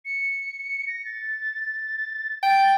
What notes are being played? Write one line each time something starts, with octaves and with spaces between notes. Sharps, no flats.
C#7
A#6
A6
G5 A6